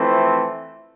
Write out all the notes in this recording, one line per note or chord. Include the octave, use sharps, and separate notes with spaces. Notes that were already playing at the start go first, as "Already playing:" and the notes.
Already playing: F2 E3 A3 C4